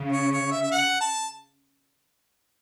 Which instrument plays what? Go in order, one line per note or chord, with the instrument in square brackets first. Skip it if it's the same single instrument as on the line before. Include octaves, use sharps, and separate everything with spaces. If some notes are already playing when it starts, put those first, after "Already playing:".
Already playing: [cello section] C#3
[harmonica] C#5
C#5
E5
E5
F#5
A5